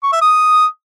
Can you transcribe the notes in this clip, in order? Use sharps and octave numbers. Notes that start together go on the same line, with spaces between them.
C#6
E5
D#6